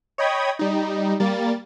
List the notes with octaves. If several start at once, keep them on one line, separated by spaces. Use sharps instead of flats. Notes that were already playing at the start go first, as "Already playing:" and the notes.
C#5 D#5 G5 B5 D#6 G#6
G3 D#4
G3 A#3 A6